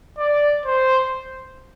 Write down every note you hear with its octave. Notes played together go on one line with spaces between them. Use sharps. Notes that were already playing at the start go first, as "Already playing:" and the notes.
D5
C5